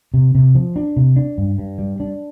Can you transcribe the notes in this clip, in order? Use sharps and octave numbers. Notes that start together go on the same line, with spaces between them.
C3
C3
F3
D4
C3
D4
G2
G2
G3
D4